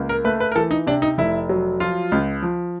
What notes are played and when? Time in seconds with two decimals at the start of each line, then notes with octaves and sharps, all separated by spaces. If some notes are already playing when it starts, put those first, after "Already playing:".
Already playing: C#2 A#3
0.09 A#4
0.24 A3 B4
0.40 B4
0.52 A#4
0.56 E3 A4
0.71 D#4
0.87 C3 D4
1.02 D#4
1.18 F1 E4
1.49 F#3
1.80 F3 F4
2.12 C#2
2.42 F3